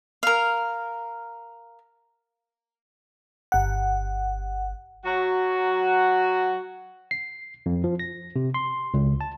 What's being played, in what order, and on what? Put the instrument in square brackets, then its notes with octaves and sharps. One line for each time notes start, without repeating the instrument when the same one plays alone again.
[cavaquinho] A#4 F5
[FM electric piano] G1 F#5
[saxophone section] F#3 F#4
[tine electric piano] C7
F2
F3
A#6
C3
C6
C#2
A5